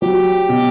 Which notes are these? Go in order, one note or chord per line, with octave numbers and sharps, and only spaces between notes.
F#3 G4
B2